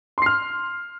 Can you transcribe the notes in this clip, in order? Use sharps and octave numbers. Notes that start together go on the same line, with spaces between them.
C6 F6 C7